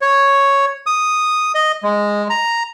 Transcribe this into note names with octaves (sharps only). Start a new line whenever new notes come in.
C#5
D#6
D#5
G#3
A#5